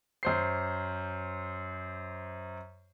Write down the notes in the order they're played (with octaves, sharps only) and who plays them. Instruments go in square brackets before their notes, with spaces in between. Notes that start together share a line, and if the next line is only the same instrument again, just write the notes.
[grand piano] F#2 C5 C7